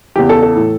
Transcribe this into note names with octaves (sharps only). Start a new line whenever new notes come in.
E2 C#3 E3 G4
A4
A4
A2 E3